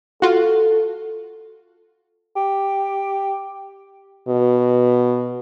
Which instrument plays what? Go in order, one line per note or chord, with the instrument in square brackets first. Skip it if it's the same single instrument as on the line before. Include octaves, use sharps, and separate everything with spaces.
[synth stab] F4 F#4 [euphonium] A4
[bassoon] G4
[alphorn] B2